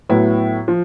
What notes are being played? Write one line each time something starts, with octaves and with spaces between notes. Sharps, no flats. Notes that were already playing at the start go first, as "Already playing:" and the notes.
A2 F#3 B3 E4
F3